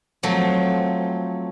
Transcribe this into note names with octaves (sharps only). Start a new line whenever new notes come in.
F3 F#3 A3 C4